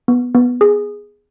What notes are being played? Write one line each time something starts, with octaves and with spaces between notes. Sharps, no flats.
B3
B3
G#4